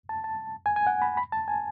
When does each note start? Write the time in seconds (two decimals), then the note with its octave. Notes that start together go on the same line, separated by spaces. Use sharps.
0.09 A5
0.24 A5
0.66 G#5
0.76 G#5
0.87 F#5
1.02 B5
1.17 B5
1.32 A5
1.48 G#5